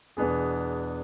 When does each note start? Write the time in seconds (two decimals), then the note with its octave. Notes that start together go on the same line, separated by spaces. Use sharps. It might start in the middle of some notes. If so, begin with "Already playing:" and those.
0.17 E2 B2 B3 D4 G#4